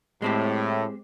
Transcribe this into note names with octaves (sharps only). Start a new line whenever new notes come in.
A2 G#3 C4 G4